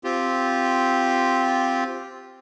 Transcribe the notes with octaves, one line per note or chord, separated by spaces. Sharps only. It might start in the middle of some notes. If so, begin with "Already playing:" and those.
C4 F4 G4